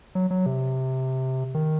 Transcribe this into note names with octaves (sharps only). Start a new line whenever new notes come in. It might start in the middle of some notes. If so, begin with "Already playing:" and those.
F#3
F#3
C3
D#3